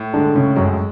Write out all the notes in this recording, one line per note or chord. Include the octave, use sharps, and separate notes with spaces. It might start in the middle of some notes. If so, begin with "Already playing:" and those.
Already playing: A2
D3 G#3 D4
A2 C#3 C#4
F#2 F#3 G#3